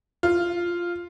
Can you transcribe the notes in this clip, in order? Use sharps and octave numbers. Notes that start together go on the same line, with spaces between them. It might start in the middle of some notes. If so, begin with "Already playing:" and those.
F4